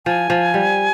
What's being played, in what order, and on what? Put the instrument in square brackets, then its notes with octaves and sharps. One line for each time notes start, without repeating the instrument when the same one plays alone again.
[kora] F3 [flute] G#5
[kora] F3
G3